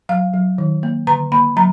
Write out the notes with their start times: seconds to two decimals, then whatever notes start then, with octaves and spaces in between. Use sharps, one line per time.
0.09 F#3 F5
0.34 F#3
0.58 D#3
0.83 A#3
1.07 D3 A#5
1.32 A#3 B5
1.56 F#3 A#5